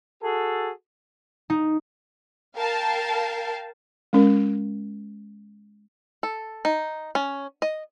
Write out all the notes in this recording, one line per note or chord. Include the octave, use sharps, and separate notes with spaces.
F#4 G#4 A4
D#4
A#4 F5 G5 A5
G#3 C#4 A#4
A4
D#4
C#4
D#5